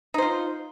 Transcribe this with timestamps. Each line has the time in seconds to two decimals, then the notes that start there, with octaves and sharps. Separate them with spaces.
0.14 D#4
0.18 C5
0.22 F4